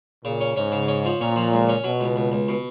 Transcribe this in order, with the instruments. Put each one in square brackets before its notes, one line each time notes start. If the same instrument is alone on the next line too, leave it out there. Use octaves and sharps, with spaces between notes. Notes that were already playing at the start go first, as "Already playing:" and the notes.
[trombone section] A#2 [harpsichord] C#3
[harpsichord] C#4
[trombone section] G#2 [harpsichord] C#4
[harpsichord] C#3
C#4
F3
[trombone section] A#2 [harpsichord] C#4
[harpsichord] F3
C#2
C#4
[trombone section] B2 [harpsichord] F#3
[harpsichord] C#2
C#2
C#2
B2